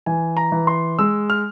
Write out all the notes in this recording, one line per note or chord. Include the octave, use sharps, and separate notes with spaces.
E3 G#5
A#5
E3
C6
G#3 E6
F6